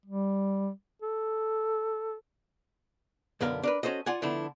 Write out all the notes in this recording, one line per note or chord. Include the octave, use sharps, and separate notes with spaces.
G3
A4
B1 F#2 D3 B3 A#4 F5
D4 A#4 B4
C#4 F#4 A4 C5 D#5
F4 D5 F#5 G#5
D3 F3 A3 B3 D4 E4